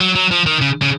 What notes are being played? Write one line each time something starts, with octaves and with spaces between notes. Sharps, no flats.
F#3
F#3
F3
D#3
C#3
C#3